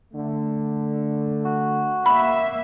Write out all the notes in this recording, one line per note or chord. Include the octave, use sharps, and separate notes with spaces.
D3 A3
F#4
A#3 E5 B5